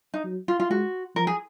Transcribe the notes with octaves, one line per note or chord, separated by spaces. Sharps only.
D#4
F#3
F4
F4
G#3 F#4
F3 A#4
G#4